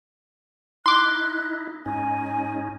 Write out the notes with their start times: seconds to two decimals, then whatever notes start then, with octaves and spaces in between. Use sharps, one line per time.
0.86 D#4 E4 C6 D6 F#6
1.86 G#2 C#4 D#4 G#5